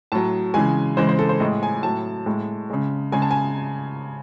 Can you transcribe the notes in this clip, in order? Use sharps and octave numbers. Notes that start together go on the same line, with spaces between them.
A2 F#3 A5
C#3 E3 G#3 G#5
C#3 E3 G#3 C5
C5
A4
C5
A2 G#3 D#5
G#5
A2 F#3 A5
A2 G#3
C#3 G#3
C#3 G#3 G#5
A5
G#5